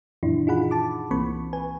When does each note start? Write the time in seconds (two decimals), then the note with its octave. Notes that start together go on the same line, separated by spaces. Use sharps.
0.23 F#2 A#2 D#3 E3 D4 E4
0.47 D#4 F4 G#4 F#5 B5
0.71 A5 D6
1.11 C2 E3 A#3 C4 B5 C#6
1.53 B4 G#5